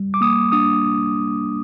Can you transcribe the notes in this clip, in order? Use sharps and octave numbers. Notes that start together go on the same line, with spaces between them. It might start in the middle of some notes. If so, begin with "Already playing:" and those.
Already playing: G3
D6
A#3 D#6
D4 D#6